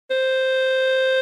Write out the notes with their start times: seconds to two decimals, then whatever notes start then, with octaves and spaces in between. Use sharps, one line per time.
0.10 C5